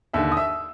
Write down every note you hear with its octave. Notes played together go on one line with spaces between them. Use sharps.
D#2 D3 E5 E6
D#6
E5 E6